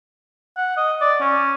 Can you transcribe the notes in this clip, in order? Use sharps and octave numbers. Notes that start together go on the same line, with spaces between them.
F#5
D#5
D5
C#4